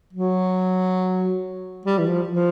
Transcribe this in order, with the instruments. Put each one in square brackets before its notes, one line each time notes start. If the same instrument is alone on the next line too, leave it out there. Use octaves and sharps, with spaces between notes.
[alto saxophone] F#3
G3
E3
F3
F3